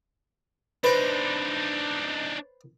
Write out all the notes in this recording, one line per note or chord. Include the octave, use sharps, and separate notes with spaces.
D4 D#4 B4 C5